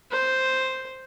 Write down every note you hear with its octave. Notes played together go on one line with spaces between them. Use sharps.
C5